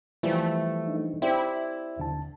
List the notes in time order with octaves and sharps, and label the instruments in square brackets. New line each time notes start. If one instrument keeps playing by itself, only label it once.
[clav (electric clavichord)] E3 F3 G3 [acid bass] A3
[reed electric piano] D4 D#4
[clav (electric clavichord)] C4 G4 [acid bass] E4 [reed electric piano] D5 E5
[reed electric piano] D#2 D3 A5